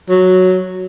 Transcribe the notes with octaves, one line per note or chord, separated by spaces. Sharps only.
F#3